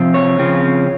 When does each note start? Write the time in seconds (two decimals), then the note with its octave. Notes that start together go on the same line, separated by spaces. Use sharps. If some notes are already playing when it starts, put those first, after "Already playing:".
Already playing: C3 F3 C4
0.14 C#5
0.38 C#3 F3 C4